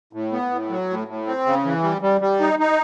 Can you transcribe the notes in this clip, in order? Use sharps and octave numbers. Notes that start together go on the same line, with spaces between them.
A2
B3
A2
F#3
A2
A2
C4
C#3
E3
G3
G3
G3
D#4
D#4